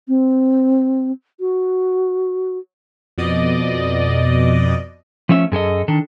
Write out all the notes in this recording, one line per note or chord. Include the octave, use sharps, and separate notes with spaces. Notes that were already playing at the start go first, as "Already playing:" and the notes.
C4
F#4
F2 B2 D5 D#5
F3 A3 C#4 E5
F#2 G#4 A4 D#5
D#3 D4 A4